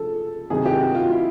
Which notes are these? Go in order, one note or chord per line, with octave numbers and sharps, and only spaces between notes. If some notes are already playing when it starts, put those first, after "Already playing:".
Already playing: C#3 F3 A4
C3 D#3 F#3 G#4
G4
F#4
F4
E4